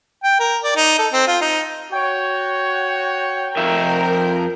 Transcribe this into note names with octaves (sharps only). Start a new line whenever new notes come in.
G5
A#4
D5
D#4
A4
C4
F4
D#4
F#4 C#5 G5
F2 F4 A#4 E5